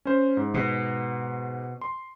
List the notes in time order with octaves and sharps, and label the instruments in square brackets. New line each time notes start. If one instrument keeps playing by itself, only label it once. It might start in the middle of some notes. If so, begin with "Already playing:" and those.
[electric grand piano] C#4 C5
G#2
[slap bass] B2
[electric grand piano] C6